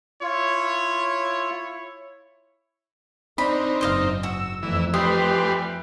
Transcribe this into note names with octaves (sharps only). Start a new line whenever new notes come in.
E4 F4 C#5
C4 D4 D#4 B5
F#1 G#2 C5 D#5 F5
F#4 E6
F2 E3 A3 E6
E3 G3 G4 B4 C6 D#6